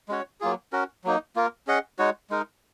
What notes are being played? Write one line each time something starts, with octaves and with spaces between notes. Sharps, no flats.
G#3 C#4 F#4 C#5
F#3 A#3 F4 G#4
C#4 F#4 A#4
F#3 A#3 D#4
A#3 F4 A#4
C#4 G#4 D#5 F#5
G#3 D#4 F#4 C#5
G#3 D#4 A#4